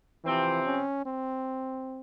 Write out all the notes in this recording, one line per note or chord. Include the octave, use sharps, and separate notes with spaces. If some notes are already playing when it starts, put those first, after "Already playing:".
C3 E3 F3 C4
C#4
C4